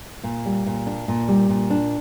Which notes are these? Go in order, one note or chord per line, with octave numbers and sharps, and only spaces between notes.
A#2
G3
A#2
D4
A#2
G3
A#2
D4